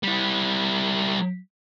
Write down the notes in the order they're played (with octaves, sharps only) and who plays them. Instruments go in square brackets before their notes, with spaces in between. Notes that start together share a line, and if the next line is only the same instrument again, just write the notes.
[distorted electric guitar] G3 E4